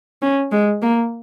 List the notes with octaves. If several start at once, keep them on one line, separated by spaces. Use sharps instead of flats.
C#4
G#3
A#3